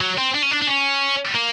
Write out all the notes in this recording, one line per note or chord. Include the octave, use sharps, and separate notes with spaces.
F#3
C4
D4
C#4
D4
D4
C#4
A#3